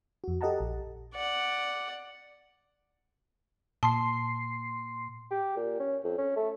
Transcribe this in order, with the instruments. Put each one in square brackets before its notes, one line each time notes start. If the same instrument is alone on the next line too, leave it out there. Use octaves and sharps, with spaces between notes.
[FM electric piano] F2 F#4
G4 A4 D#5 F#5 A5 A#5
A#1
[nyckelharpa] D5 F#5
[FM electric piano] A#2 C6 C7 [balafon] A5
[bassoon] G4
A#2
C#4
F2
C#4
A3